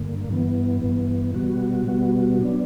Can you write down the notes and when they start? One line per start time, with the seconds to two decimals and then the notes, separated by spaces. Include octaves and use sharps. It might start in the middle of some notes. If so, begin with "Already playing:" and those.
Already playing: G2 D3 A#3
0.29 G2 E3 B3
0.82 G2 E3 B3
1.34 B2 G3 B3 F#4
1.86 B2 G3 B3 F#4
2.39 F#3 B3 D4